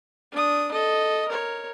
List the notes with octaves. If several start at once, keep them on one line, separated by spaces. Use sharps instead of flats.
D4 D#6
A4 D#5
A#4 C#5